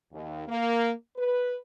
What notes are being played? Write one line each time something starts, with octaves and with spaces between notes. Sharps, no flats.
D#2
A#3
B4